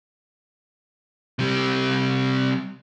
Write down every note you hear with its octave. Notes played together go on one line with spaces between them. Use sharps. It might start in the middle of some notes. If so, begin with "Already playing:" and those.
C3 G3